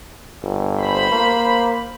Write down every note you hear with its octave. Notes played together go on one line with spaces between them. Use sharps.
G1
C5 B5
A#3